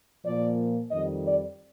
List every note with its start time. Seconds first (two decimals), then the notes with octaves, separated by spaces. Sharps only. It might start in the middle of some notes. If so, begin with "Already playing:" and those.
0.24 A#2 F3 A#3 D5
0.91 F2 D#3 G3 D#5
1.25 D5